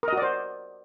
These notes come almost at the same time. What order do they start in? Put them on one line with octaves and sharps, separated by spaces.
A#4 D#5 F#4 D5 C5